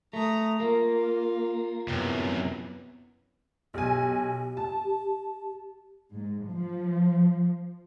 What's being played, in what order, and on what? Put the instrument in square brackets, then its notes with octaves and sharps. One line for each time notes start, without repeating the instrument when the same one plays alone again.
[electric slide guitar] A3 [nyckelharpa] A#5 D#6
[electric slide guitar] A#3 [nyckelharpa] F4
[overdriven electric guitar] F#2 C3 [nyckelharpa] B3 E4
[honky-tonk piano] B1 G#5 [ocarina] G4
[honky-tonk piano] A5
[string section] G#2
F3